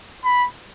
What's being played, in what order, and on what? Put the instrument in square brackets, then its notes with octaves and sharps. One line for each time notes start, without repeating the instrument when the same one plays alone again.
[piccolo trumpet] B5